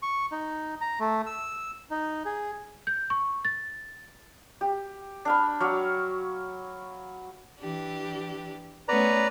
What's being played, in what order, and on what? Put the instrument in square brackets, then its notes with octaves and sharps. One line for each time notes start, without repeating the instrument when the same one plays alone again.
[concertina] C#6
D#4
A#5
A3
E6
D#4
G#4
[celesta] G6
C#6
A6
[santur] G4
D4 F5 B5
F#3 F5 C#6 D6
[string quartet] E3 D4 G4
[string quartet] A3 B3 C#4 [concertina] B4 D5 A#5